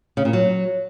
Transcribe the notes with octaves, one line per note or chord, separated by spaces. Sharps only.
C#3
A#2
F#3